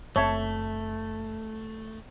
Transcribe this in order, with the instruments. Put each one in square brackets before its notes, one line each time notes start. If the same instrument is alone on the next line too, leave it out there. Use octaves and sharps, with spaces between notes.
[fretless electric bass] F#1 C4 [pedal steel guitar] A3 [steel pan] C#5 [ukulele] E5 A5